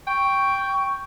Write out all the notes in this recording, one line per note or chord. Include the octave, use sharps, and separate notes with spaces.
G5 C#6